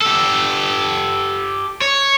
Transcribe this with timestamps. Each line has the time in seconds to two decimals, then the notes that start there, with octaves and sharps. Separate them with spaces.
0.02 G4 A4
1.82 C#5